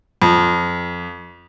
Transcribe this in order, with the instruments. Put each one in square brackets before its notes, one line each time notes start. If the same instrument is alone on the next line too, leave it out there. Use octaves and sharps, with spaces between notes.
[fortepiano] F2